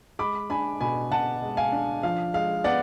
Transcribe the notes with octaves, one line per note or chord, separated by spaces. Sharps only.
G#3 B5 D6
D4 G#5 B5
B2 G#5 B5
B2 F#5 A5
G#3
F5 G#5
D4
F3 F5
G#3 F5
B3 D5 F#5